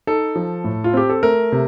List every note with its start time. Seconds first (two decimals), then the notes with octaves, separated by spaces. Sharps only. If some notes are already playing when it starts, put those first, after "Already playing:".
0.07 D#4 A4
0.36 F3
0.64 A2
0.84 F4
0.93 C4 G4
1.10 A4
1.23 A3 A#4
1.52 C3